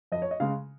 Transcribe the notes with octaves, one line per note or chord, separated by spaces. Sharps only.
F2 D#5
C#5
D#5
C#3 G#3 F5